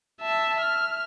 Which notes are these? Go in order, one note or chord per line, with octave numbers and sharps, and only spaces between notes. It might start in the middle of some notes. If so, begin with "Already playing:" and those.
E5 A5
F6